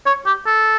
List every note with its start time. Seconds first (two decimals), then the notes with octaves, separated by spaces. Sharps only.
0.06 C#5
0.26 G4
0.46 A4